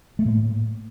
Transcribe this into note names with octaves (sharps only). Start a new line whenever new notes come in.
A2 A3 A#3